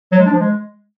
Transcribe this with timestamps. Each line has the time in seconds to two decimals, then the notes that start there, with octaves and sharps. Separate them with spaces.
0.12 F#3
0.19 G#3
0.26 D4
0.33 F3
0.40 G#3